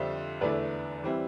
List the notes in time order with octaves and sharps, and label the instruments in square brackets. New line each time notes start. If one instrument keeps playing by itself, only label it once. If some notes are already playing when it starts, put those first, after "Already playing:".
Already playing: [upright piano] F2 D3 G3 D4 F4 [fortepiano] C5 E5
[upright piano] E2 D3 A3 E4 [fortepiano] B4 D5
[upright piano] E3 G3 C4 E4